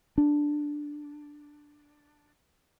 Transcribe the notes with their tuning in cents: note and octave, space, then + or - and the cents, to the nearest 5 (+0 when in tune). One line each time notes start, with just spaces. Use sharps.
D4 +5